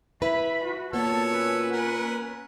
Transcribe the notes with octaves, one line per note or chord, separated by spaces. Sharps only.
E4 B4 E5 B5
F#4
A#2 B3 F#4 A4 C#5 E6
C#4 B4
A#4 F#5 G#5